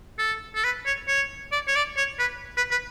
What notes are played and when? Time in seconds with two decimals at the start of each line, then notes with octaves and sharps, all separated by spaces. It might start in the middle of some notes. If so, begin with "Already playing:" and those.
0.19 A4
0.55 A4
0.64 B4
0.86 C#5
1.08 C#5
1.52 D5
1.67 C#5
1.75 D5
1.97 C#5
2.19 B4
2.57 B4
2.71 B4